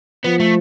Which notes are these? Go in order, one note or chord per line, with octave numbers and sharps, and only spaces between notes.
F3 B3
A3